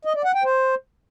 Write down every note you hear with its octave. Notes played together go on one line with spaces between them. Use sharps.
D#5
D5
F#5
G5
C5